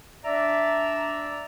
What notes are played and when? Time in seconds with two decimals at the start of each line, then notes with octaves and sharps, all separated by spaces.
0.25 D4 D5 E5 A#5